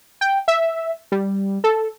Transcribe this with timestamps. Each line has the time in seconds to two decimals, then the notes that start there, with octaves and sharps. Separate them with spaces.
0.21 G5
0.48 E5
1.12 G3
1.64 A4